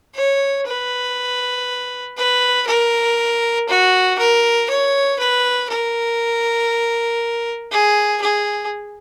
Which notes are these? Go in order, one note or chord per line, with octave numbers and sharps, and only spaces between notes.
C#5
B4
B4
A#4
F#4
A#4
C#5
B4
A#4
G#4
G#4